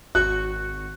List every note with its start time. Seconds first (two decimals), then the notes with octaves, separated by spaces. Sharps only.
0.15 G#1 F#4 F#6 C#7